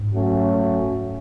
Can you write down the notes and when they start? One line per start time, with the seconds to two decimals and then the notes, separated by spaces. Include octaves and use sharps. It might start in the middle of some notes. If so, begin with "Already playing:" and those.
Already playing: G#2
0.14 F#3 A3 C#4 F#4